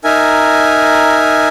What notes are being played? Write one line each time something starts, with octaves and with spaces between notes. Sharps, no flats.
D#4 A#4 E5 G#5